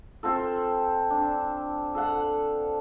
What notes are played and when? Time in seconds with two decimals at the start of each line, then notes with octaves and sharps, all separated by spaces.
0.23 C4 F4 A4
1.10 D4
1.95 A4 F5 F#5